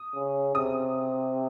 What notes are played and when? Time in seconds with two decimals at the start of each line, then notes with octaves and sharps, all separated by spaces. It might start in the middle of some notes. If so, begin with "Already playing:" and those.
Already playing: D#6
0.15 C#3
0.55 C3 D#6